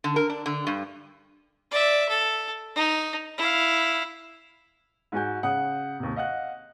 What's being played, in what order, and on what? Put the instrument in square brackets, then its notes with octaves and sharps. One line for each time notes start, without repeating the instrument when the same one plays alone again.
[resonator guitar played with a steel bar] D3
A#4
D4
D3
G2
[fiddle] D5 E5
A4
D#4
E4 F5
[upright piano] G#2 F#4 G#5 G6
C#3 F#5 D#6
D#2 C3
D#5 F5 F#5 F#6